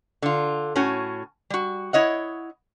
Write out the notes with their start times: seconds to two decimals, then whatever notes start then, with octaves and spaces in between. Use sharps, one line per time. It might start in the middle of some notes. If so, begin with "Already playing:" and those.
0.22 D3 F4
0.76 A2 C#4 F#4 G#5
1.50 G3 F#4
1.93 E4 C#5 D#5 F#5